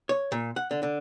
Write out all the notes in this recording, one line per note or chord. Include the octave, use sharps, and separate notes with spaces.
C#5
A#2
F#5
D3
D3